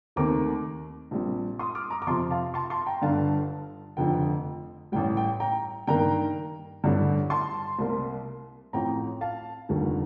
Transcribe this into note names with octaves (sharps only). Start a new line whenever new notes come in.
D#2 D#3 A3 C4 A#5 D6
A#1 A#2 G3 C4
C6 D#6
D6 F6
A#5 D6
D6
F2 C3 F3 A5 C6
F5 A5
A5 C6
A5 C6
G5 A#5
G1 G2 D3 F5 A5
F1 F2 D3 F3 G5
A1 A2 G3 G5
G5
G5 A#5
G2 D#3 A#3 G5 A#5
A1 G2 D3 G3
A5 C6
C2 C3 G3 A#3
A1 A2 F3 C4 G5 A#5
F5 A5
F1 D#2 D3 G3